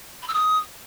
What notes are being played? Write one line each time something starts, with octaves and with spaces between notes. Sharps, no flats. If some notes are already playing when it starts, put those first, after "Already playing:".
B5
E6
D#6